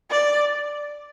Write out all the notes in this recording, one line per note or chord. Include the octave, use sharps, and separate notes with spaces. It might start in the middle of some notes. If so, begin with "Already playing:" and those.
D5